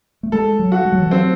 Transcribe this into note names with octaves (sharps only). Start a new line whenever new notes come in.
A3
G#3 A4
F#3
F#4
G#3
F#3
E3
F#3 C4